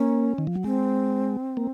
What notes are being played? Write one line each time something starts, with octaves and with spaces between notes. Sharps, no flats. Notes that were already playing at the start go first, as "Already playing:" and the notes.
Already playing: A#3 C#4
D#3
F3
F#3
G#3 C4
A#3